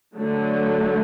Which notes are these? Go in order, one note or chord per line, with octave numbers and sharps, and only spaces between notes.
D3 F#3 A3